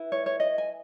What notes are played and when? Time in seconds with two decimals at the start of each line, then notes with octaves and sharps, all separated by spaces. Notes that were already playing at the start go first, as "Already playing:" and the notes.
Already playing: E4 B4
0.12 C#5
0.26 C#5
0.40 D#5
0.58 G#5